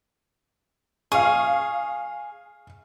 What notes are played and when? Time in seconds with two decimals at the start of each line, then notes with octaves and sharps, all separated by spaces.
1.12 G#4 F5 C#6